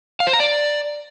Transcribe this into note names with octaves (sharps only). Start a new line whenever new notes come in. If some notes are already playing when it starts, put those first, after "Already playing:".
F5
C5
A#5
D5